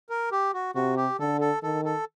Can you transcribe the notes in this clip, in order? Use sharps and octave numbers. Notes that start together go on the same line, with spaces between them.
A#4
G4
F#4
C3 F#4
G4
D3 A4
A4
D#3 A4
A4